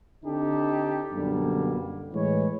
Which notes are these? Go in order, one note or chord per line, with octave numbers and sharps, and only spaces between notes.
D3 C4 D4 D#4 G4 A4
F#2 B2 D3 G3 A#3
A2 E3 G#3 B4 C#5